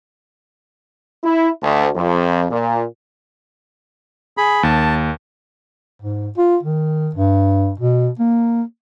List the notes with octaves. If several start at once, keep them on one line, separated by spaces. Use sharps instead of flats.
E4
D2
F2
A#2
G#4 B5
D#2 A5
G#2
F4
D#3
G2
B2
A#3